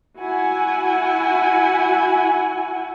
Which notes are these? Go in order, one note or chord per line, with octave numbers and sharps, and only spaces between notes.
E4 F#4 F#5 G#5